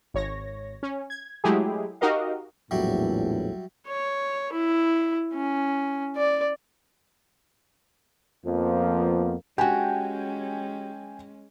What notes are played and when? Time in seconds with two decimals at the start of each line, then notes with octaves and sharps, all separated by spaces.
0.14 G#1 C#5 A#6
0.83 C#4
1.10 G#6
1.44 F#3 G#3 A3 E4 G4 G#4
2.01 D#4 F#4 G4 A#4 D#5 F5
2.71 A#1 E2 A2 F#3 G3 E4
3.87 C#5
4.53 E4
5.34 C#4
6.16 D5
8.46 F2 F3 A#3 B3
9.58 G#3 C#4 F#4 G4 G5 G#5